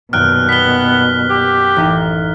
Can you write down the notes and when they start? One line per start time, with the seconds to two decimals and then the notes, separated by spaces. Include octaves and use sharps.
0.13 D#1 F#2 B2 G5 F6 F#6
0.49 B3 B6 G7
1.30 G4 D6
1.76 A1 D#4